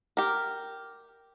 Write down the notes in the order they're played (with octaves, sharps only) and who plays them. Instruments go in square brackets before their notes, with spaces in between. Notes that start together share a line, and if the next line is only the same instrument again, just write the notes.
[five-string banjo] G4 A#4